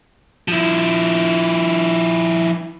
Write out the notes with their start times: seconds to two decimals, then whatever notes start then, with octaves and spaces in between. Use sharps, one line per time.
0.48 F3 E4